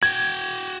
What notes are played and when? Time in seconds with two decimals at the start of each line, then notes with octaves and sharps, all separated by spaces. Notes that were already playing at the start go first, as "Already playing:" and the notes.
0.03 F#4 G5 G#6